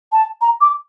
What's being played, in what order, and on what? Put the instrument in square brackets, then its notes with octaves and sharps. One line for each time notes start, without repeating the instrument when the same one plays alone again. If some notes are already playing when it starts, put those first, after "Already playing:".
[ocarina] A5
A#5
D6